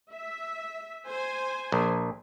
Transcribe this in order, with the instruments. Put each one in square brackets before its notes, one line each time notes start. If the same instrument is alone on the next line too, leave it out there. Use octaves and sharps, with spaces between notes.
[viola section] E5
C5 G#5
[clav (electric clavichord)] A#1